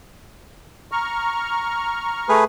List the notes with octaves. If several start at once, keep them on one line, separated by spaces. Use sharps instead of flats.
A#5 C#6 F6
A3 G#4 B4